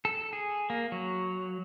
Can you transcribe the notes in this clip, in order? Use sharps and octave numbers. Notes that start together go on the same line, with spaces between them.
A4
G#4
A#3
F#3